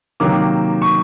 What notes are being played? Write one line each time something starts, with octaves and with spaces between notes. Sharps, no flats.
C3 D#3 F#3 A#3 D6
C#6